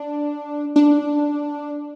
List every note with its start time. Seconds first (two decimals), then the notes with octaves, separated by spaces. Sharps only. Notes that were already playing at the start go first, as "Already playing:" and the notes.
Already playing: D4
0.76 D4